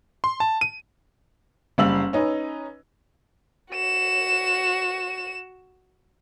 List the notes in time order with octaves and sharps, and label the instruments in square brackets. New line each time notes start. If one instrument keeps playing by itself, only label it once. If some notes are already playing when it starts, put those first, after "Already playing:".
[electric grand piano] C6
A5
D#7
[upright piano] F#1 G3 F5 E6 F#7
C#4 D#4 B4
[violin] F#4 E7